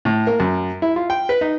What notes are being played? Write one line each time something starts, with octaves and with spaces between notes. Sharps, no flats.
A2
A#3
F#2
E4
F4
G5
B4
D#4